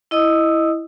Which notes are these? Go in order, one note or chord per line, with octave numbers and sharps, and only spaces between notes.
E4 D#5 D#6 E6